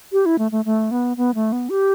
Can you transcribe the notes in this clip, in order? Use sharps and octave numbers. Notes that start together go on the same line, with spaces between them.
G4
E4
A3
A3
A3
B3
B3
A3
B3
G4